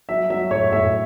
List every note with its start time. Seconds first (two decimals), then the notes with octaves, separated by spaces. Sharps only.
0.09 F#3 E5
0.30 F#3 E5
0.51 A2 C#5
0.72 A2 E5